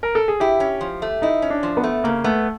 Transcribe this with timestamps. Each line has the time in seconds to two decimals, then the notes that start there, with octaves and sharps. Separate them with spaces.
0.03 A#4
0.15 A4
0.28 G#4
0.40 E4 G4
0.60 C#4
0.81 F3
1.02 A3
1.22 D#4 E4
1.42 C#4
1.50 D4
1.63 F3
1.77 B3
1.83 A3
2.04 C#3 A#3
2.24 A3 B3